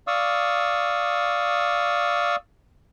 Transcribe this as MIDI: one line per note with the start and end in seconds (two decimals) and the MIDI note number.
0.07 2.36 74
0.07 2.36 77
0.07 2.36 85
0.07 2.36 87
0.07 2.36 88